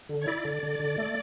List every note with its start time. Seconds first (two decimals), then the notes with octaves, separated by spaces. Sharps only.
0.09 D3
0.21 C#5
0.27 E4 D5
0.45 D3
0.63 D3
0.79 D3
0.98 A3